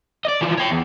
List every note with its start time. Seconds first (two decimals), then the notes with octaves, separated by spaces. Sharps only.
0.25 D5 D#5
0.41 E3 F3
0.57 C#5 G5
0.71 E2